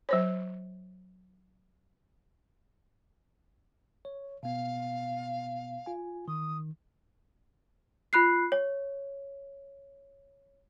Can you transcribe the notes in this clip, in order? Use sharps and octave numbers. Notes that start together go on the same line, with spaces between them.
F#3 C5 C#5
C#5
B2 B3 F5
F4 G#5
D#3 D#6
F4 B5 F#6 C7
C#5